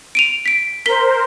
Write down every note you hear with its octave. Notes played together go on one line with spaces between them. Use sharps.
D7 D#7 F7
B6 D7
A#4 C5 B6 G7